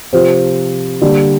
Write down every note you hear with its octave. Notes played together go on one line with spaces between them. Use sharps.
C3 F3 C4
D3 G3 A#3 D4